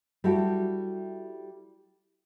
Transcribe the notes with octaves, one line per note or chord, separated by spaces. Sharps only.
G3 E4 F#4 G4 A4